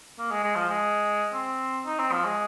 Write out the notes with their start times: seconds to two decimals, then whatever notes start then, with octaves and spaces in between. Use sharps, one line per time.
0.19 A#3
0.31 G#3
0.43 G#3
0.56 F3
0.69 G#3
1.34 C4
1.86 D#4
1.99 C4
2.12 F3
2.25 G#3